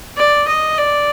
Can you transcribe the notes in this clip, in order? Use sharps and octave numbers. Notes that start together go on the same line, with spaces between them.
D5
D#5
D5